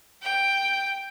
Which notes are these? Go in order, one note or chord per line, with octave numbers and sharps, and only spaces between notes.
G5